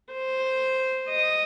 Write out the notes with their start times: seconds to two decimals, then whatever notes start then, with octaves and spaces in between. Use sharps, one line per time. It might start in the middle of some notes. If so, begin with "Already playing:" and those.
0.13 C5
1.09 D#5